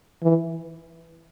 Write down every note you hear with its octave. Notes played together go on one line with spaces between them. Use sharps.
E3